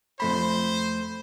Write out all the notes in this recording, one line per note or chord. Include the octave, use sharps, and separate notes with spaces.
F2 A3 C5 B5